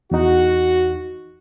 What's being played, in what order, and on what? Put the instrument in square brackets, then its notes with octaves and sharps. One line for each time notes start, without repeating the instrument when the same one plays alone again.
[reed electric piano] E2 D#4 [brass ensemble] F#4